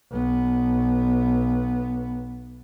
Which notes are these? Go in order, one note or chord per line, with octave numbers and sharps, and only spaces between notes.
B1 B3